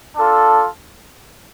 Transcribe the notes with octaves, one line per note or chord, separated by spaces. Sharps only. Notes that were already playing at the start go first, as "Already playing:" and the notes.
D4 F4 A4